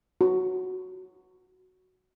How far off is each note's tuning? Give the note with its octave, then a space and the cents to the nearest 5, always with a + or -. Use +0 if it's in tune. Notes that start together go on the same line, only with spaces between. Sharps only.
F#4 +0